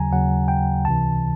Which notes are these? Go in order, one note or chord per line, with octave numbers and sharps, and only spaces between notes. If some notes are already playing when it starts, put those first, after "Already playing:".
Already playing: D#2 C#3 F#3 G#5 A#5
D#2 C#3 F#3 F#5
G5
C#2 C3 E3 A5